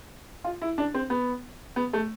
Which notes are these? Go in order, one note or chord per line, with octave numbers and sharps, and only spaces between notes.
F4
E4
D4
C4
B3
B3
A3